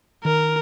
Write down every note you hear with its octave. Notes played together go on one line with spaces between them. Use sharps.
D#3 A#4